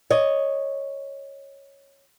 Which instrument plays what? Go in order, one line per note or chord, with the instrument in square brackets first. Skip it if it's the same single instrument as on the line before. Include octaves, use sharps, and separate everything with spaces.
[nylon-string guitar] C#5 D#5